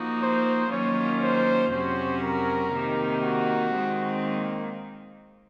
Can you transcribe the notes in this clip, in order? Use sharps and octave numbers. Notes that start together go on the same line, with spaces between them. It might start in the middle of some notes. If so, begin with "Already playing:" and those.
Already playing: F3 A#3 D#4 F#4
C5
D#3 F#3 A#3 C#4 F4 C#5
C5
F2 C3 F#3 C#4 F#4 C5
A#4
C3 D#3 A#3 D#4
F#4
D#3 G#3 C4
A#3